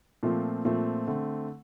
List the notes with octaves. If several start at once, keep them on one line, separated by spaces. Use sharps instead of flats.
A#2 F3 A3 C4
A#2 F3 A3 C4
D3 A3 C4